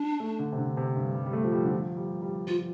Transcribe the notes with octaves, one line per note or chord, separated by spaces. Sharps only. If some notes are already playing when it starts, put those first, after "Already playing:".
Already playing: D4
A3
D3
C3
D3
C3
G2
G3
G3
A3
F3
G3
D3
F3
G3
G3
F3 F4